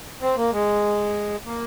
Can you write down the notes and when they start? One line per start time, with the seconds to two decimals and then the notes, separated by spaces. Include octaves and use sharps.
0.22 C4
0.37 A#3
0.52 G#3
1.46 A#3